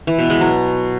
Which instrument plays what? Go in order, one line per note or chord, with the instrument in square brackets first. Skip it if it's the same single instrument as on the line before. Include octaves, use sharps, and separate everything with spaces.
[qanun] E3
B2
G#3
F#3